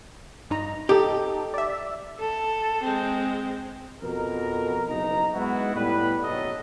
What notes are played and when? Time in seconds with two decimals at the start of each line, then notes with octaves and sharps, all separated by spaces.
0.50 G2 D#4 A#5
0.89 D#4 G4 A4
1.54 D5 E5
2.19 A4
2.83 G#3 C4
4.02 F2 B2 A#4
4.88 F#1 B1 D#4 A#5
5.34 G#3 B3 D#4 E4 F#4
5.75 A2 G3 B3 B4
6.23 F#1 B1 F#3 A3 D#5